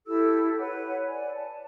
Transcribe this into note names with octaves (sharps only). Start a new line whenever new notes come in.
E4 G4 A4 E6
B4 C#5 F#5
D5 G#5
A5